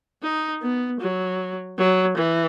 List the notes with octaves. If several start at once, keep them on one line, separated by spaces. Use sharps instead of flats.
D#4
B3
F#3
F#3
E3